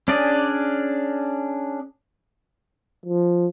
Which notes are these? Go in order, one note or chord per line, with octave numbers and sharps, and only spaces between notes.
C#4 D4 G#4 D5
F3